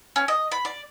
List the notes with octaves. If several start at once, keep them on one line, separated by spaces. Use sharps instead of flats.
C#4
D#5
B5
D5